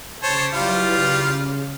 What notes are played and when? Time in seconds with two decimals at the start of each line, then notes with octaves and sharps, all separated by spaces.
0.23 C#3 C5 C#5 A5 D6 B6
0.54 F#3 G3 E4 F4 B4 F5
0.95 C#3